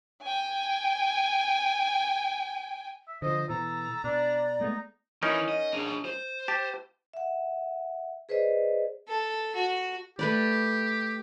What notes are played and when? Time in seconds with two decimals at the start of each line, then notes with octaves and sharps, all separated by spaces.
0.23 G5 G#5
3.08 E5
3.22 D3 F3 C5 D#5
3.49 B2 E3 A4 A#5
4.04 B2 D4 D5
4.61 G#3 A3 B3 D#4
5.23 E3 C#4 D#4 E4 A#4
5.49 D#5
5.73 D4 G#4
6.05 C5
6.48 G4 A5
7.13 E5 F#5
8.29 G#4 B4 C5 D5 D#5
9.08 A4
9.55 F#4
10.19 A3 G4 B4 D5